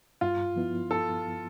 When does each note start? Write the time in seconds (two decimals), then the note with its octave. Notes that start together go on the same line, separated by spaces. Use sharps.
0.21 G2 F4
0.56 F3 B3 E4
0.91 A4